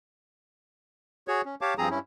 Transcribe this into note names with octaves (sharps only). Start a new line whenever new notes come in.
F#4 G#4 C#5
C#4
G4 C#5 F5 A5 D6
G2 F3 C4 G#4 A#5 D#6
G2 C#4 E4